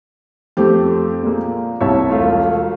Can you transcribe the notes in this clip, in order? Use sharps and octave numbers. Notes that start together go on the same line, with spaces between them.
F2 A3 C4 G4
A#2 G#3 A#3
C2 C#5 E5 A5
E1 A3 F4